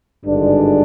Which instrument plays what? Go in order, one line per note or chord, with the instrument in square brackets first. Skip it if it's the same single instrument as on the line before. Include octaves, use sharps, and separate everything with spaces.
[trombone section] G#1 G2 D3 G#3 D4